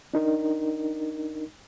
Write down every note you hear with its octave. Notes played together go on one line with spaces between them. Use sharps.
D4 D#4 A#4